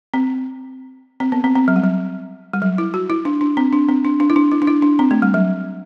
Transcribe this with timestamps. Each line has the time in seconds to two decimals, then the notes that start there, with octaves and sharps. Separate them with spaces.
0.14 C4
1.20 C4
1.32 B3
1.44 C4
1.55 C4
1.68 F#3
1.76 G3
1.84 F#3
2.53 G3
2.62 F#3
2.78 E4
2.94 F#4
3.10 E4
3.25 D4
3.41 D4
3.57 C4
3.73 D4
3.89 C4
4.05 D4
4.20 D4
4.30 E4
4.36 D4
4.52 E4
4.62 D4
4.67 E4
4.82 D4
4.99 C4
5.11 A3
5.22 G3
5.34 F#3